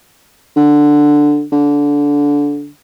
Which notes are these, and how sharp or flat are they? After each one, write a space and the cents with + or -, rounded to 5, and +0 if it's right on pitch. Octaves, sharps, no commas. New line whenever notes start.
D3 +5
D3 -20